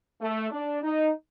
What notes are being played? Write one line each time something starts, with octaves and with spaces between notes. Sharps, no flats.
A3
D4
D#4